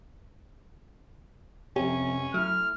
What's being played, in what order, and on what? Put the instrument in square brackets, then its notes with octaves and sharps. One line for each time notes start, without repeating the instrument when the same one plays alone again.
[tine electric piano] F2 C3 [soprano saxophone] C#4 [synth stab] G4
[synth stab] F#3 [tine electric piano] A3 E4 [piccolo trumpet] F6